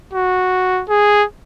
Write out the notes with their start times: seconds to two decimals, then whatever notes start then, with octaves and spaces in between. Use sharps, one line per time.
0.14 F#4
0.89 G#4